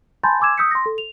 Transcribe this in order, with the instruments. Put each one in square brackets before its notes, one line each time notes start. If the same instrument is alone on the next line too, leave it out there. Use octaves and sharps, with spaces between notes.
[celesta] G#5 A5 B5 C6 G6 A6
G#5 C6 D6 E6 G#6 E7
D#6 E6 G6 B6 C#7
C6 A#6
A4
F7